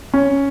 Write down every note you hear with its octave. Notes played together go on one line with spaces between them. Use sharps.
C#4